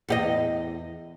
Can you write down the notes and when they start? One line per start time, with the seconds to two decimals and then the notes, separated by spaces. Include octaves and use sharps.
0.09 E2 G4 D#5